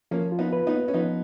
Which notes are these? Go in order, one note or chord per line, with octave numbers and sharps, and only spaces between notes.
F3 A#3 C#4
F4
B3 D#4
B4
B3 D#4
A#3
C#4
F3 B3 D#4